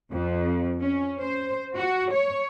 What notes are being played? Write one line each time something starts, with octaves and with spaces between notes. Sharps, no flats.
F2
C#4
C5
F#4
C#5